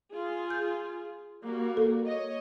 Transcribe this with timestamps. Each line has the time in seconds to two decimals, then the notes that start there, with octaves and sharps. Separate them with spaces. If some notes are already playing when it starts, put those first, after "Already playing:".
0.14 F4 G#4
0.50 G6
1.44 G3 A#3 F#4
1.77 A4
2.06 C#5 D#5